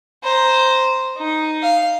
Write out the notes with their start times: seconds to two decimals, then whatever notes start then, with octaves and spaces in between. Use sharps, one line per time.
0.23 C5 A#5
1.17 D#4
1.63 F5